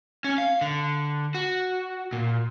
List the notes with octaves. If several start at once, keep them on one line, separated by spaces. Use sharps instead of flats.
C#4
F5
D3
F#4
A#2